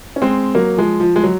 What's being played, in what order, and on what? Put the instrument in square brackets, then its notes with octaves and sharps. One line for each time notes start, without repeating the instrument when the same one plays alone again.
[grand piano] C#4
G#3 C4
F#3 A#3
F3 G#3
F3
G#3
F#3